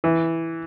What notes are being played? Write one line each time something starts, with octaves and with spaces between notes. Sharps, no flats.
E3